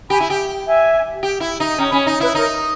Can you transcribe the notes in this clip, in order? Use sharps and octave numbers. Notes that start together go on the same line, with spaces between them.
G4 G#5 B5
E4
G4
E5 G#5
G4
E4
D#4
C#4 G5 A#5
C#4 G#5 B5
D#4
E4 B4
D#4 A#4 C#5